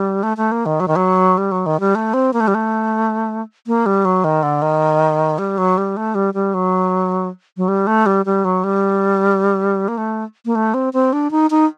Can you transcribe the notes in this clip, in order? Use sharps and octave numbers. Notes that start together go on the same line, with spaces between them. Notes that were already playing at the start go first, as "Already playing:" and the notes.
Already playing: G3
A3
A3
A#3
D#3
F#3
D#3
F#3
G3
F#3
D#3
G3
A3
C4
A#3
A3
G3
A3
A#3
G3
F#3
D#3
D3
D#3
G3
F#3
G3
A3
G3
G3
F#3
F#3
G3
A3
G3
G3
F#3
G3
A#3
A3
A#3
A3
C4
C4
D4
D#4
D#4